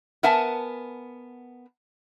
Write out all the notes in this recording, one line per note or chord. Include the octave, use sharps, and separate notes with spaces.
B3 A#4 E5 F#5 G#5 A5